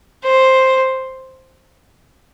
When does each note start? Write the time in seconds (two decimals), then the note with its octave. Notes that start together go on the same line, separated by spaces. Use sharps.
0.23 C5